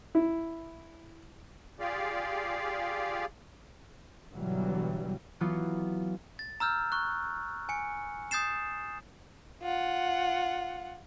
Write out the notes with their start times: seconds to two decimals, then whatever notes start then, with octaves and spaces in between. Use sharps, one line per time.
0.15 E4
1.80 F4 G4 G#4 D5 F5
4.33 G1 B2 E3 F#3 G3
5.40 E3 F#3 B3 F4
6.39 A6
6.60 A#5 E6 F6 G6
6.92 C#6 F#6
7.69 G#5 C#7
8.31 D#6 G6 A6 C7 E7
9.62 F4 F#5